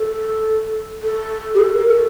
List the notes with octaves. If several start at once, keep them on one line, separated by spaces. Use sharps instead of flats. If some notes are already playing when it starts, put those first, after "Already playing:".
Already playing: A4
A4
G4
A4
A#4
A4